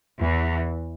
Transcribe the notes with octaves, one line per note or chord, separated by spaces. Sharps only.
E2 E3